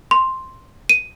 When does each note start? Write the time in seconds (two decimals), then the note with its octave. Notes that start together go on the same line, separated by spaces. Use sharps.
0.11 C6
0.89 D#7